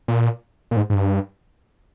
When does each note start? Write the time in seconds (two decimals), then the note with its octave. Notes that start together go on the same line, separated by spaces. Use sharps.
0.08 A#2
0.71 A#2
0.77 G#2
0.90 G#2
0.94 G2